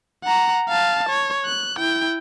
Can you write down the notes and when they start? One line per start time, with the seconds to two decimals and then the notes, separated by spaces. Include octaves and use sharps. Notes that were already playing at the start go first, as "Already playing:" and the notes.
0.23 F#5 A#5
0.68 F5 A5
1.10 C#5
1.46 F#6
1.79 E4 G5